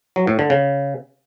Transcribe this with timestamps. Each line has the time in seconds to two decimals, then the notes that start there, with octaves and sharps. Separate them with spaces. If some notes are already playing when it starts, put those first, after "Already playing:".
0.16 F#3
0.27 A2
0.39 D3
0.50 C#3